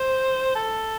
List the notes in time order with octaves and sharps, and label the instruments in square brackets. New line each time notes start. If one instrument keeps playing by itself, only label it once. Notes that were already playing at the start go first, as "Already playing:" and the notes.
Already playing: [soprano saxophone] C5
A4